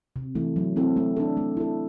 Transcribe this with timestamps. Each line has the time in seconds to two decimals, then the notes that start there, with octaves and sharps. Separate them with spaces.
0.16 C3
0.35 E3 A3 E4
0.56 F#3
0.76 A3 C4 E4 A4
0.96 A3
1.17 D4 A4
1.37 A3
1.57 E4 A4